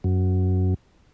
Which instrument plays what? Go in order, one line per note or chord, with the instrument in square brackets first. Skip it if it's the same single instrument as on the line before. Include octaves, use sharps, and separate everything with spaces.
[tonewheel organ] F#2